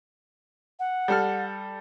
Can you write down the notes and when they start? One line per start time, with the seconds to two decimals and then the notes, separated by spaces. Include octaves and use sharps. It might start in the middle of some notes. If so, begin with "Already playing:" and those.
0.80 F#5
1.08 G3 A4 F6